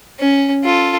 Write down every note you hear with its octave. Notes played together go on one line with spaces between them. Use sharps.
C#4
F4 A4